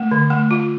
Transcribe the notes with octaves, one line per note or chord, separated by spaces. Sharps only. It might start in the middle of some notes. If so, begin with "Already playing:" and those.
Already playing: A3
D3
A3
F4